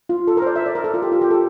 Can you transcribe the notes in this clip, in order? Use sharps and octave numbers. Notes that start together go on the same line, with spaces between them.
F4
A4
A#4
C5
D5
E5
D5
A#4
A4
F4
G4
F4
G4
A4